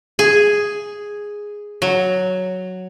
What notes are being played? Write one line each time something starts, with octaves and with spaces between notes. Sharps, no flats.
G#4
F#3